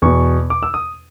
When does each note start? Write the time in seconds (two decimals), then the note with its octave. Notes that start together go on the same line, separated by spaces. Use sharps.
0.02 E2 B2 C#6
0.50 D6
0.63 E6
0.74 D#6